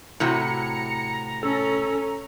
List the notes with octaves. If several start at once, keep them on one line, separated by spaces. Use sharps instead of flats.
A2 C3 F#4 A#5 C#7
C#4 A4